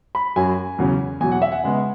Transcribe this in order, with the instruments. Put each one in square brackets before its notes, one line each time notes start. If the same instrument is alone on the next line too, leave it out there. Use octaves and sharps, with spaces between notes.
[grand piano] B5
F#2 F#3 C#4 G#5
E2 C#3 F#3 C#4
E2 B2 F#3 G#5
F#5
E5
F#5
C#3 G#3 B3